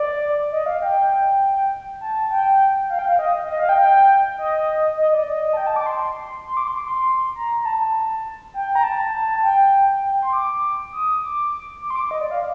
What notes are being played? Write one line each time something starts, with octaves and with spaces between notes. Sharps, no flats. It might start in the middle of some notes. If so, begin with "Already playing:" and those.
Already playing: D5
D#5
F5
G5
A5
G5
F5
G5
F5
D#5
D#5
F5
G5
G5
D#5
D#5
D5
D#5
A5
G5
A5
D6
C6
C6
D6
C6
D6
C6
A#5
A#5
A5
G5
A#5
A5
A5
G5
G5
C6
D6
D#6
D6
D6
C6
D6
D#5
D5
F5